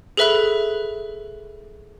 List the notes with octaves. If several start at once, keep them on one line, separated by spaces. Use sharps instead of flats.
G#4 A4 B4 E5 B5 F#6